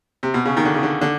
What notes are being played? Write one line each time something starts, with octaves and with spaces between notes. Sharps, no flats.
C3
B2
C#3
D#3
D3
C#3
D3
D3